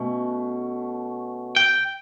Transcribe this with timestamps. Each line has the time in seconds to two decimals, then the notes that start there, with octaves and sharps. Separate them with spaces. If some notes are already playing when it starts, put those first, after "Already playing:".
Already playing: B2 A3 C#4
1.56 G5